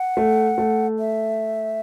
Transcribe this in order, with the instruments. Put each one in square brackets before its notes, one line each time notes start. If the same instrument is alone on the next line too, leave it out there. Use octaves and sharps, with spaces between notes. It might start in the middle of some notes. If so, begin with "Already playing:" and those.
Already playing: [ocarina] F#5
[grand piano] A3
A3
[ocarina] E5